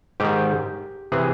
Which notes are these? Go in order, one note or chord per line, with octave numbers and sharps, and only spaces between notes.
G#2 D#3 G4
C3 E3 G#4